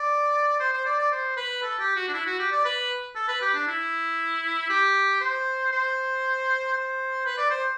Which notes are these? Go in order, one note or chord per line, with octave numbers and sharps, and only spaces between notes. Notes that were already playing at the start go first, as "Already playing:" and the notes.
Already playing: D5
C5
C5
D5
D5
C5
B4
A4
G4
F#4
D4
E4
F#4
G4
D5
B4
A4
B4
G4
D4
E4
G4
C5
C5
C5
B4
D5
C5